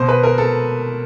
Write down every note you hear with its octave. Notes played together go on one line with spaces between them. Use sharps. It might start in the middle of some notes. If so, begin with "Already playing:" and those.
Already playing: B2 C5
B4
A#4
A4